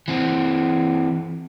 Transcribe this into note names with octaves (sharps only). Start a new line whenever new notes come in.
E3 C4